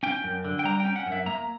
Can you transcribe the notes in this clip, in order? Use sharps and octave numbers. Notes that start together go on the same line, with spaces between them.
C#4 G5
F#2
D3
G5
G3 A#5
G5
C#4
F#5
F#2
E5
A#3 A#5